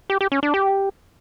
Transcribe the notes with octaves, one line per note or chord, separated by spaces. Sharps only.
G4
G4
C#4
D4
G4